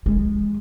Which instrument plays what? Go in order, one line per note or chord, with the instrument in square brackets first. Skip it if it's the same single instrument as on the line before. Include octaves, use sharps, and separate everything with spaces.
[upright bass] G#3